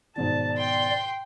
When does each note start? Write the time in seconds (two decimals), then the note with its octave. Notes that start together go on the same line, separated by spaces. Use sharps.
0.16 G#2 B2 D#3 D5 A5
0.58 G5 C6